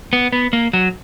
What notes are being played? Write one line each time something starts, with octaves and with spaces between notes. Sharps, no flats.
B3
B3
A#3
F#3